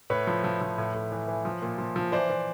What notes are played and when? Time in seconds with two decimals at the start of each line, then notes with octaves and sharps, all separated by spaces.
0.10 A2 B4 C#5
0.27 F3
0.44 F3
0.61 F3
0.78 A2
0.94 A2
1.12 E3
1.28 E3
1.45 F3
1.62 A#2
1.78 F3
1.96 F3
2.12 E3 C5 D5
2.29 E3